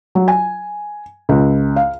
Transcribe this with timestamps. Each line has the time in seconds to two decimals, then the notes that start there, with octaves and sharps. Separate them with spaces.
0.15 F#3
0.28 G#5
1.29 C#2
1.76 F5